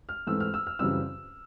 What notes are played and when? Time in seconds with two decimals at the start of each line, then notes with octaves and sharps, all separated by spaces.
0.09 F6
0.27 G#2 E3 A3 C4 E6
0.40 F6
0.54 E6
0.67 F6
0.79 F#2 C#3 E3 G3 C4 E6